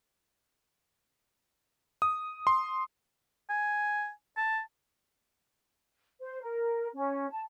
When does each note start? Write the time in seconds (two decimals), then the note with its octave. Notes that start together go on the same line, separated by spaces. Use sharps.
2.02 D#6
2.47 C6
3.49 G#5
4.37 A5
6.21 C5
6.42 A#4
6.93 C#4
7.30 A5